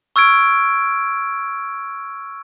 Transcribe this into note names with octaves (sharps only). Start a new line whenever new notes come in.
C#6 E6 F6 G#6 D7